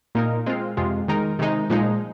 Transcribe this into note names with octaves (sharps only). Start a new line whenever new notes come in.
A#2 A#3 D#4 A#4
G#3 C4 F4
F2 C3 G#3 F4
D#3 G#3 D#4 A#4
C3 D#3 G#3 D#4
A#2 F3 G#3 D#4